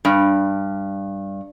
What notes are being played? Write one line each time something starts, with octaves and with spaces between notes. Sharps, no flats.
G2